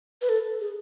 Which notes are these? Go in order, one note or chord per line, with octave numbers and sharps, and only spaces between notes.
B4
A4
G#4